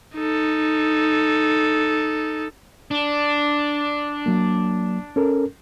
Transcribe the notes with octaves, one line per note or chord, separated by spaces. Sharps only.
D#4 A4
D4
F#3 A#3
C#4 A4 A#4